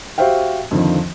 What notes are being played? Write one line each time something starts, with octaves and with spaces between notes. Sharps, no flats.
F#4 G4 C5 E5 F5 G5
F2 D3 D#3 F3